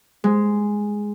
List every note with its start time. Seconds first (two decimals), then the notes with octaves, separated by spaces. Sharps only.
0.24 G#3